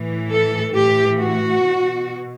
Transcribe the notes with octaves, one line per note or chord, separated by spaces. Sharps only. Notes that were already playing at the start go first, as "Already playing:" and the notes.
Already playing: A2 E3
A4
A2 E3 G4
F#4
B2